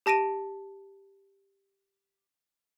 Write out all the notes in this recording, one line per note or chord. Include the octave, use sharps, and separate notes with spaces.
G4 A5 A#6 D7 D#7